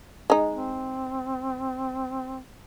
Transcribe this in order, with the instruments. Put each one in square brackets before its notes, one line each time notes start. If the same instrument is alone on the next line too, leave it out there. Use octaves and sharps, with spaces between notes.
[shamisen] G#3 D#4
[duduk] C4